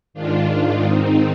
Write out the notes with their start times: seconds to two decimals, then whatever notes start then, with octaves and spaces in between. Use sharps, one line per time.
0.14 G#2 D#3 D4 F4
0.82 C4 D#4